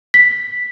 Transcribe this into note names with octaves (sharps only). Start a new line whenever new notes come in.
B6